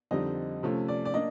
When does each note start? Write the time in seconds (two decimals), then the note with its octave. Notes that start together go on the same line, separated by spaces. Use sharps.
0.11 F2 D3 G3 C4 D#4 D#5
0.63 C3 F3 A3 C#4
0.88 D5
1.05 D5
1.14 A#3 D4 D#5